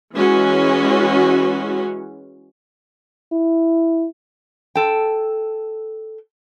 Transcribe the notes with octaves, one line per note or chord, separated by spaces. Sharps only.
E3 G#3 C#4 F#4
E4
A4 G5